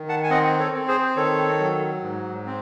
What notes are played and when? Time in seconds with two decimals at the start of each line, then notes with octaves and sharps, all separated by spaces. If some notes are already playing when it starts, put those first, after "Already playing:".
Already playing: D#3
0.09 F#5 A5
0.24 G#5
0.30 C4 D#5 F#5
0.59 A4 C#5
0.74 C4
0.88 G#4 C5
1.16 D#3 A4 C#5
1.59 F#3
2.02 G#2
2.46 C4